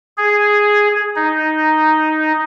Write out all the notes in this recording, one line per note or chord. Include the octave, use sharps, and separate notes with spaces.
G#4
D#4